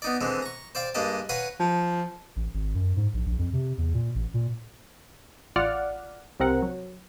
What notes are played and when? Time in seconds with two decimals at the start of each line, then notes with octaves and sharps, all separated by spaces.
0.02 B3 D#4 D5
0.21 D3 E3 G#3 C4
0.42 A#5 C#6
0.75 C5 D5 F5 G5
0.94 G2 G#3 A#3 D#5 G5 A5
1.29 B4 C#5 F5 F#5 G#5 A#5
1.60 F3
2.36 A1
2.54 G#1
2.75 F#2
2.96 G#2
3.14 A#1
3.26 A#1
3.39 F2
3.53 C3
3.78 E2
3.94 A#2
4.15 A1
4.34 A#2
5.56 A1 F4 D5 F#5 F6
6.40 C2 C3 C4 A#4 F#5
6.62 F#3